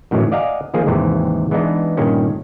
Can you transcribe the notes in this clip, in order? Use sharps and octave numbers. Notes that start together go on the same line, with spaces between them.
F#2 A2 D#3 E3 F#3
D5 D#5 F5 F#5 G#5 A#5
D#3 F3 A#3 G#4
D#2 G#2 C3 E3
E3 G#3 B3 D4 D#4
G2 A#2 D#3 C#4